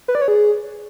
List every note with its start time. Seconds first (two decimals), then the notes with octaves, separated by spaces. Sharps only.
0.08 B4
0.15 D5
0.21 C#5
0.28 G#4